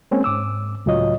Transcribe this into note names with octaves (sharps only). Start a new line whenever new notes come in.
G#3 A#3 C4 C#4 C#5 G#5
G#2 D6 E6
C#2 A2 F#3 F4 C#5 D#5